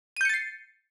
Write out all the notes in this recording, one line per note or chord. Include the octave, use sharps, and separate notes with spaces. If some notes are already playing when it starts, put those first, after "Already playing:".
G6 A6 C7 C#7 D#7